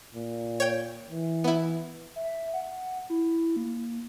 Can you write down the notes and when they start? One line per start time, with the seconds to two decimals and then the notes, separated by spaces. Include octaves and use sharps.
0.15 A#2
0.60 C#5 G5
1.10 E3
1.44 B3 E4
2.16 E5
2.53 F#5
3.10 E4
3.56 A#3